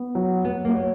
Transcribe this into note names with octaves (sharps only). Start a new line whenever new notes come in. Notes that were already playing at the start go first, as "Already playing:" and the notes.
Already playing: B3
F#3
F#3 B3
A#3
C#5